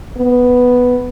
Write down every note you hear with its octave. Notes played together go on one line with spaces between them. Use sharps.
B3